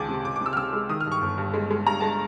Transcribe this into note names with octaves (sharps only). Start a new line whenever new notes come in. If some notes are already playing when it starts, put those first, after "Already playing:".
Already playing: C#2 D#3 G#3 G#5 A5 D6
C3
C#2 D6
D6
C3 E6
F6
C3 E6
G#3
D#3 D#6
F6
G2
C#6
G1
G2
G#3
G#3
G2 A#5
G#3 A5